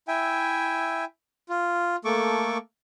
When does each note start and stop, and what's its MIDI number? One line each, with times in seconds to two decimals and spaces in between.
0.08 1.05 64
0.08 1.05 76
0.08 1.05 79
0.08 1.05 80
1.49 1.96 65
2.05 2.58 57
2.05 2.58 58
2.05 2.58 69
2.05 2.58 85
2.05 2.58 86